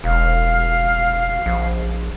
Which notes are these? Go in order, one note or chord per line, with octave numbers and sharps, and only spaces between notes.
E1 F5
A#1